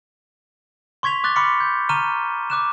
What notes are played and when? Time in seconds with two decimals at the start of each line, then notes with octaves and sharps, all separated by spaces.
1.03 C6 C#6 G#6 B6 F7
1.24 D6 F#6 A6 G7
1.36 B5 C6 D6 F6 B6 C#7
1.60 G6
1.89 A#5 C#6 F6 D#7 E7 G7
2.50 D6 F#6 E7